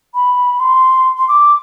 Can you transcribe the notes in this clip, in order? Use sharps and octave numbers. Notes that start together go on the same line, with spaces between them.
B5
C6
C6
D6